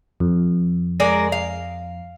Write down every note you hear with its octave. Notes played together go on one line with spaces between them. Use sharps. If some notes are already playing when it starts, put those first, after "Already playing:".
F2
G#3 A#4 D5
F5